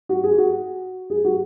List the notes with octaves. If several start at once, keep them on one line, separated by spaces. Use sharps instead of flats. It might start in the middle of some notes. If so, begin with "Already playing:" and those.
F#4
G#4
F#4
G#4
F#4